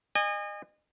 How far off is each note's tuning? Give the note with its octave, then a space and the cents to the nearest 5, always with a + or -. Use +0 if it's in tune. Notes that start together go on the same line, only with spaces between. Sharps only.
D#5 -35 G#5 -30